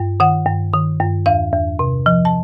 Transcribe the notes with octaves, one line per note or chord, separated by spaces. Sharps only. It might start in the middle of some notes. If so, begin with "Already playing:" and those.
Already playing: G2
D#3 F#5
G2
D#3
G2
E2 F5
E2
C3
F3
A5